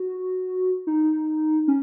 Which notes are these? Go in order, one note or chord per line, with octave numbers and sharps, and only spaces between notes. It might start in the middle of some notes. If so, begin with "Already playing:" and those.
Already playing: F#4
D#4
C#4